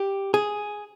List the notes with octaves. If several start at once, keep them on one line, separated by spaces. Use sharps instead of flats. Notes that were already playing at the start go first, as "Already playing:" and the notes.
Already playing: G4
G#4